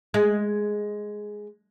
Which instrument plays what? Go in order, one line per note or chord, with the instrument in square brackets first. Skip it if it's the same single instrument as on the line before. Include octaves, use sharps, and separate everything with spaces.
[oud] G#3